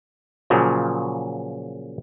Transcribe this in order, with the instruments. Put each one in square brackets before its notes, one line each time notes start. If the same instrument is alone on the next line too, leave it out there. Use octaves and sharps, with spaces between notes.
[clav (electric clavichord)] A#2 C#3 F3 F#3